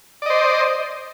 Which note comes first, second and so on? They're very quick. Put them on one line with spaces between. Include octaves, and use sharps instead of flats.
D5 D#5 C5